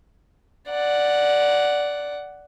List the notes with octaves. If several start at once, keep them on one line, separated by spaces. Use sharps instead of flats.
D5 F#5